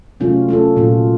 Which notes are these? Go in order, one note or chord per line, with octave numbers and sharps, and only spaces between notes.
C3 F#3 A3 C#4 F4
A3 C#4 F4 A4
A#2 F#3 A#3 F4